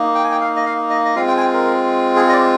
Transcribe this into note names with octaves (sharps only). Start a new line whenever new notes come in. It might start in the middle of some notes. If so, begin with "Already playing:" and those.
Already playing: A#3 D#4
G5
G#5
G5
F5
D#5
F5
D#5
D#5
G#3 C4 F4 F5
G5
G#5
G5
A#4
G#4
D#5
D5